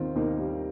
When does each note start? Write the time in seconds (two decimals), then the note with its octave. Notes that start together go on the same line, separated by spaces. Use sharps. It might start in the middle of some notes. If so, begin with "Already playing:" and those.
Already playing: D#2 D#3 C4 F4
0.15 D#2 A#3 D#4
0.39 G3